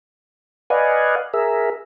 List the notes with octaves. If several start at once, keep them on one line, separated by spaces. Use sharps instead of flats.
B4 D5 D#5 F5 F#5 G#5
G#4 A#4 E5